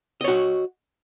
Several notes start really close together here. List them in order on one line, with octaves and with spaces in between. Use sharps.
D#5 C#5 F#4